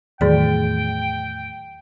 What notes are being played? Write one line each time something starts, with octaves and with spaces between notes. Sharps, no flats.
E2 A2 D#3 F#3 G#4 D5 G5